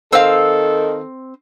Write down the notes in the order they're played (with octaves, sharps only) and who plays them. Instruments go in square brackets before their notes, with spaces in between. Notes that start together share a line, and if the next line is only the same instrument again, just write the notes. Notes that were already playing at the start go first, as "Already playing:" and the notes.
[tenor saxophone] D#3 [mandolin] C4 E6 [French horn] A4 [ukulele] C5 F5